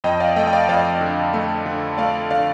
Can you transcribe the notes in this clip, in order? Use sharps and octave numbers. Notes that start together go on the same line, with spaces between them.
F2 D#5 G5
D5 F5
A3 D#5 G5
G5
D5 F5
F2 D5 F5
D3
A3
D3
A3 D5 F5
D3 D5 F5